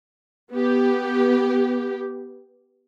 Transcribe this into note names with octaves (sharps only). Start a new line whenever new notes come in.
B3 G4